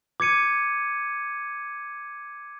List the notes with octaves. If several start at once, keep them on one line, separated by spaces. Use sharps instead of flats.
D6 G#6 C#7 D#7